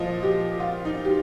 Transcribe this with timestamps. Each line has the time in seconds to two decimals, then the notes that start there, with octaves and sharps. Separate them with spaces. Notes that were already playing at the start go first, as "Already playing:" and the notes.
Already playing: A#2 F3 D#5
0.23 G4
0.60 F4
0.85 D#4
1.05 G4